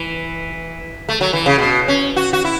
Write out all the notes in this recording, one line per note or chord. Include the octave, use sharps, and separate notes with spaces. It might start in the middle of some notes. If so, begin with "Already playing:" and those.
Already playing: E3
A3
F#3
E3
C#3
B2
C#4
F#4
F#4
E4